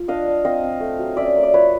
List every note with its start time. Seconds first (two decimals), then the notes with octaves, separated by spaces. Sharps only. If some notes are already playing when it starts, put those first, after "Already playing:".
Already playing: F4
0.08 D4 D#5 F5
0.27 D4
0.44 C4 D#5 F5
0.63 C4
0.80 A3
0.99 F#3
1.17 C#4 D5 E5
1.36 A#3
1.43 D5
1.54 F4 B4 C#5